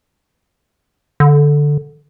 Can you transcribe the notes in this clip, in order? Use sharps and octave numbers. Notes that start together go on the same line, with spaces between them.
D3